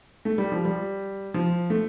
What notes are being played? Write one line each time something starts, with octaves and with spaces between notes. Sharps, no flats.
A3
G3
F3
G3
F3
A3